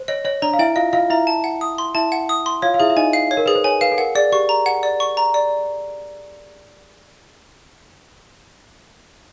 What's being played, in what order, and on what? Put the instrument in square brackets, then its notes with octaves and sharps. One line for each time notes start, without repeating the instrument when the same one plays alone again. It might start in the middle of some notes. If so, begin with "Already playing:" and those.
Already playing: [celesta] C5
[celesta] C#5 [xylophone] D#5
[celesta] C#5 [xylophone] D#5
[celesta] D4 D5 [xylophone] A#5
[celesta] F5
[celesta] E4 E5 [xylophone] G5
[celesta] F4 F5 [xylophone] D#5
[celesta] F4 F5 [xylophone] D#5
[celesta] E4 E5 [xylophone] A#5
[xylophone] A5
F#5
D#6
C6
[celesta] E4 E5 [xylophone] A5
[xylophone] F#5
D#6
C6
[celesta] F4 F5 [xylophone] C#5
[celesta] F5
[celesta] E4 E5 [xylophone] G#4
[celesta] E5
[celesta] D#4 D#5 [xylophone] G#5
[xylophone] F5
C#5
[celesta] A#4
[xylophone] G#4 [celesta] B4
[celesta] C5
[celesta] C#5 [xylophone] G#5
[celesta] B4 [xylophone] F5
[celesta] A4
[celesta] A#4 [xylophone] F#5
[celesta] G#4 [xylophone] D5
[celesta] G4 [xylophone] C#6
[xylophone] A#5
F#5
D5
C#6
A#5
D5